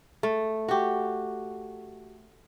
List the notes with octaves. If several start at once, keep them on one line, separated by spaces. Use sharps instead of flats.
A3
F#4 G4